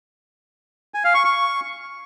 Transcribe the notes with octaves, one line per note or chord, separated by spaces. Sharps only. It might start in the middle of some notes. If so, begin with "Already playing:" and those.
G#5
F5
C#6
C#6